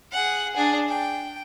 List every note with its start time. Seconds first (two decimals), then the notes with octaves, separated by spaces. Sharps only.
0.12 G#4 F#5
0.55 D4 G#4
0.88 G5